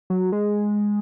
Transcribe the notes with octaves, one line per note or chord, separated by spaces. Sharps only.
F#3
G#3